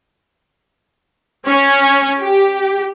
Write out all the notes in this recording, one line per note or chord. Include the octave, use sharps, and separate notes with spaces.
C#4
G4